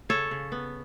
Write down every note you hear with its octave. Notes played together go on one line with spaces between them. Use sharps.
C#3 A4 C#5
C#3
B3